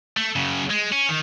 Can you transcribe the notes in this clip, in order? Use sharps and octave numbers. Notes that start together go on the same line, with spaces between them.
A3
F#2 C#3
G#3
C#4
D#3